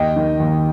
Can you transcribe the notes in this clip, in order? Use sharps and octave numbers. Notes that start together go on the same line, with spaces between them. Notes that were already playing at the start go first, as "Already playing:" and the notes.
Already playing: D#2 D#5 G5
D#3
D#2